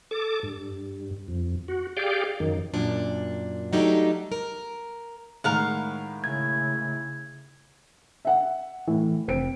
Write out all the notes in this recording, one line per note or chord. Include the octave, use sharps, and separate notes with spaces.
A4 D6
G2
F2
F#4
G4 G#4 D5 F5 G5
F#2 D#3
F#2 A#2 D4
F#3 G3 A3 D4 D#4 G4
A#4
A2 D#3 G#3 A#4 F5 F#5
C#3 E4 G#6
E5 F#5
A2 E3
F1 C4 D7